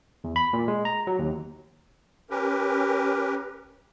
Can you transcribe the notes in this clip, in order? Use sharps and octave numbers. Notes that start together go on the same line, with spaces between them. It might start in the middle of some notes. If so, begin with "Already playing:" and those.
E2
B5
A#2
G#3
A#5
F#3
D#2
C#4 G4 A#4 B4